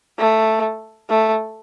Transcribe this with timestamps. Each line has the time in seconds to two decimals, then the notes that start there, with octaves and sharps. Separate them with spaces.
0.19 A3
1.10 A3